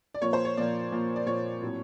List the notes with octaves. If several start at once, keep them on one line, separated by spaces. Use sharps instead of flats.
D5
A#2 F3 A#3 C#5
C5
C#5
A#2 F3 A#3 D5
A#2 F3 A#3
D5
A#2 F3 A#3 C#5
A2 F#3 A3 C4